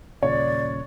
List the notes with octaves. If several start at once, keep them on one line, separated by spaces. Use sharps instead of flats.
D#1 A#2 C#3 C#5 D5